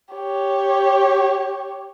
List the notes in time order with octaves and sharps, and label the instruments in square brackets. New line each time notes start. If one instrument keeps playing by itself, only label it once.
[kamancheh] G4 C#5